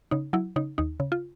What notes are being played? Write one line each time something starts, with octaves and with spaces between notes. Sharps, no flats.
C#3 D#4
F#3 E4
C#3 D#4
D#2 D#4
C#3
F4